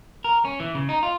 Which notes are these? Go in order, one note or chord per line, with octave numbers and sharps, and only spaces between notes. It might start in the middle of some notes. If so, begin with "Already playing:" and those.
A#4
C#4
E3
C#3
D#4
F4